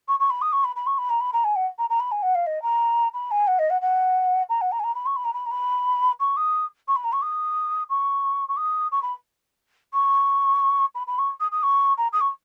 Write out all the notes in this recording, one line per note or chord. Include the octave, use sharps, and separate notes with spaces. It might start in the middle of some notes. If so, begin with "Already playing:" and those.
C#6
C#6
B5
D#6
C#6
B5
B5
C#6
B5
A#5
B5
A#5
G#5
F#5
A#5
A#5
B5
G#5
F#5
F5
D#5
A#5
B5
G#5
F#5
D#5
F#5
F#5
A#5
F#5
A#5
G#5
A#5
B5
C#6
B5
A#5
B5
A#5
B5
C#6
D#6
C#6
B5
A#5
C#6
D#6
C#6
C#6
D#6
C#6
B5
C#6
B5
B5
C#6
D#6
D#6
C#6
A#5
D#6
C#6